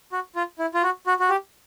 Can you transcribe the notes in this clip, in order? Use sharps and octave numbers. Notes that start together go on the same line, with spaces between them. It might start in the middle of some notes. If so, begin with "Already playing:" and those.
F#4
F4
E4
F4
F#4
F#4
F#4
G4